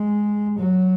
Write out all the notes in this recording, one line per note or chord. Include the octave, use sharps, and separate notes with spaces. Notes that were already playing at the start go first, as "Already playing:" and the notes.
Already playing: G#3
F#3